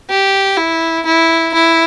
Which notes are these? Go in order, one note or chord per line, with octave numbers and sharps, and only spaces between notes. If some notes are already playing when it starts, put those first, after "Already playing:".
G4
E4
E4
E4